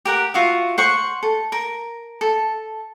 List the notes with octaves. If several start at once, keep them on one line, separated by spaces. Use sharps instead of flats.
G4 A#4 F#5
F4 F#4 E5
C5 F#5 C#6
A4
A#4
A4